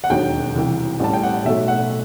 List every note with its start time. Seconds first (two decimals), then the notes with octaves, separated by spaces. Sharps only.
0.04 F#5
0.10 E1 D#2 D#3 F#3 G5
0.55 C2 C3 E3
1.00 A1 A2 G3 A5
1.13 G5
1.23 F#5
1.45 B1 B2 F#3 A3 E5
1.68 F#5